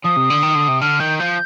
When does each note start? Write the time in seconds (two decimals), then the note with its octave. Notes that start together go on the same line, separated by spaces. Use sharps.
0.04 F3 D#6
0.16 C3
0.30 D3
0.43 D#3
0.55 D3
0.69 C3
0.81 D3 F6
1.00 D#3 G6
1.19 F3 G6